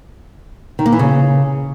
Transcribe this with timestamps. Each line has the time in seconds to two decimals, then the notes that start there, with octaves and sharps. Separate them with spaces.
0.79 D#3
0.86 A#3
0.92 E3
0.99 C#3